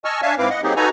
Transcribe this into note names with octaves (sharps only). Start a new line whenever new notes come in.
D#5 G#5 A5 C#6 E6 F6
D4 C#5 E5 F5 G#5 A5
G#2 C4 E4 B4 F5 D6
D#5 F#5
F#3 A#3 C4 D#4 G4 G#4
D#4 F#4 A4 B4 G#5 A#5